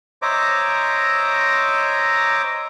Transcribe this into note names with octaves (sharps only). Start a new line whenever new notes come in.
C5 C#5 D#5 E5 A#5 D6